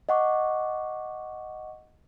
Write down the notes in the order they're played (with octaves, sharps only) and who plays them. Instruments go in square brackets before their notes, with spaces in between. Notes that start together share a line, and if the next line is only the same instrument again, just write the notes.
[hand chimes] D#5 F#5 C#6 D6